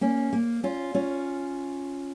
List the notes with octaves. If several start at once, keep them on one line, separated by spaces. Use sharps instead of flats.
A#3 C#4
A#3
C#4 F4
C#4 F4